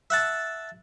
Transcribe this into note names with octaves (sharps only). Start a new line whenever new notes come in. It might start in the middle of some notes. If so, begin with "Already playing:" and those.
E5 F#5 A5